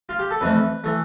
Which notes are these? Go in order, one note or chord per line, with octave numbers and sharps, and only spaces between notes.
F4
G4
A4
F2 E3 A3 B4
E3 A3